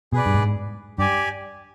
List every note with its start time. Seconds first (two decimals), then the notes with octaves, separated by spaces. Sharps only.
0.13 B2 G#4 B4 D5
0.26 G2
0.34 G#2
0.98 G2 G4 D5 G#5